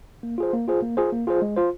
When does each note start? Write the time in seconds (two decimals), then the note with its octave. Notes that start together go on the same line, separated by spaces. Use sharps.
0.23 A#3
0.38 F4 G#4 C5
0.53 A#3
0.68 F4 G#4 C5
0.82 A#3
0.97 F4 G#4 C5
1.12 A#3
1.27 F4 G#4 C5
1.42 G#3
1.56 F4 C5